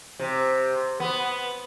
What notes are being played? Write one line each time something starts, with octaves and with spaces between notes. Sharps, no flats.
C3
B3